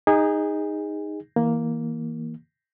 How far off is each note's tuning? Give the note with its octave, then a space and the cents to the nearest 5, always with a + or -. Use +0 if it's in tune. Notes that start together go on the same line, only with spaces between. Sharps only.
D#4 +0 G#4 -25
E3 -25 A#3 +0